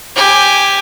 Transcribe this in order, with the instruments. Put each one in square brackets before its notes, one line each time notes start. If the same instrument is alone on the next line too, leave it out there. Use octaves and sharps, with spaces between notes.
[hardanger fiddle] G4 G#5